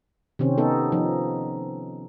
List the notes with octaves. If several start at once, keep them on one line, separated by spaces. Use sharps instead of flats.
C3 D#3 C4 C#4
B3 D#4 A4
F3 D#4